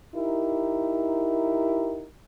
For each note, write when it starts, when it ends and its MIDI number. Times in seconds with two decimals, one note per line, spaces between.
0.15 2.06 63
0.15 2.06 64
0.15 2.06 67
0.15 2.06 70